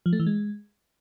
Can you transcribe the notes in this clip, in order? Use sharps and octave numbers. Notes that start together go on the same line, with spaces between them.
F3
A3
E3
G#3